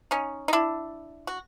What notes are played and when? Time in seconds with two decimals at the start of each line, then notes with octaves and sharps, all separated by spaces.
0.11 C#4 D#4
0.48 D#4
0.53 D4 E4
1.27 F#4